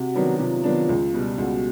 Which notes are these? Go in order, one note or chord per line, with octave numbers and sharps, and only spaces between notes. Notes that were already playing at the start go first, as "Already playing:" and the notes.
Already playing: C3 F#4
D#3 F#3 B3 D4
C3 F4
D#3 F#3 B3 D4
C#2
B2 G3
C#2 F#4